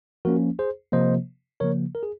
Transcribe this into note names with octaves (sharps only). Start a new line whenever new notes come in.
F3 A#3 C#4 F#4 A#4
G#4 C5
C3 F3 A#3 C5 D#5
C#3 F3 A#3 A#4 C#5
A#4
G#4